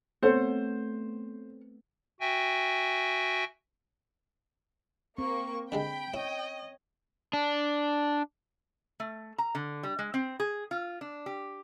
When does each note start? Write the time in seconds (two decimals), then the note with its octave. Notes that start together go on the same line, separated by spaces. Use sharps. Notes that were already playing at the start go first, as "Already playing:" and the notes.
0.23 A3 B3 C4 A4 C5 C#5 F#5
2.20 F#4 E5 G5 G#5
5.18 A#3 C4 C#6
5.72 D3 G3 G#3 G5 B5
6.14 E4 C#5 D#5
7.33 D4
9.00 A3
9.38 A#5
9.55 D3
9.83 G3
9.99 G#3
10.14 C4
10.40 G#4
10.71 F4
11.01 D4
11.26 G4